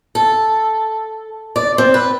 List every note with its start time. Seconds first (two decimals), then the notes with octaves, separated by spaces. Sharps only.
0.15 A4
1.56 D5
1.78 C4
1.94 B4